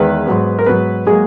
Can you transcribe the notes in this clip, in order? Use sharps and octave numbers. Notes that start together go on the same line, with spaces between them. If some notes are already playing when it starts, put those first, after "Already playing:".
Already playing: E2 D#3 G#3 B4
G#2 F#3 B3
A#4
G#2 F#3 B3 B4
F#3 G#3 A#3 G#4